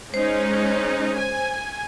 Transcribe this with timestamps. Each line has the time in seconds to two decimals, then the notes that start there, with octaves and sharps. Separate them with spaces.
0.14 G#3 C#4 D#4 C5
1.18 G#5